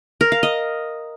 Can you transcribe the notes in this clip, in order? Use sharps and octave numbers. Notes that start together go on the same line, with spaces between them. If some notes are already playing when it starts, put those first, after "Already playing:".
A#4
F5
D#5